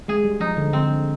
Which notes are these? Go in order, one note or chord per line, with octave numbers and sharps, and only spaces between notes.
G#3 G#4
G3
F3 D#4
D3
D3 C4